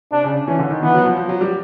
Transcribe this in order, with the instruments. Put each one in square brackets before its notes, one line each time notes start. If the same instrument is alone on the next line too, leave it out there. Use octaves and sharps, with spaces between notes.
[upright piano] C3 [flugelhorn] D4
[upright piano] C#3
[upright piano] E3 [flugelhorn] C#4
[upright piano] D3
D#3
[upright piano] E3 [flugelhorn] B3
[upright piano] F#3
F3
F3
F#3
G3